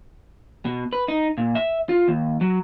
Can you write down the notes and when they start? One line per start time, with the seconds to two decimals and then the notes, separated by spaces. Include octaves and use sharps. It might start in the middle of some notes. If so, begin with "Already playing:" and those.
0.65 B2
0.93 B4
1.08 D#4
1.38 A#2
1.55 E5
1.89 F4
2.08 D#2
2.41 F#3